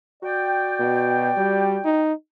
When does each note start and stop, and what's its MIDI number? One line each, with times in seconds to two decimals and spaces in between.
0.22 2.00 66
0.22 2.00 74
0.22 2.00 79
0.80 1.32 47
1.37 1.79 55
1.85 2.13 63